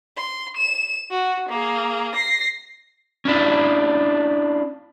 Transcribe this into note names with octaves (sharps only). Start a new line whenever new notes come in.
C6
E7
F#4
A#3 G#4
A#6 C7
C#4 D4 E4 F4